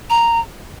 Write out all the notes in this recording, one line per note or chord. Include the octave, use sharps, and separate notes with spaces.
A#5